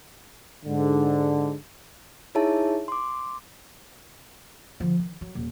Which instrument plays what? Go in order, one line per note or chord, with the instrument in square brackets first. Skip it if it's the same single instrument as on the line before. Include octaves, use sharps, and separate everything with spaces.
[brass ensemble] G#2 D3
[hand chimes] D#4 E4 G#4 C#5 E5 A5
C6 D6
[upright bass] D3 F3
D#3
F#3
D#1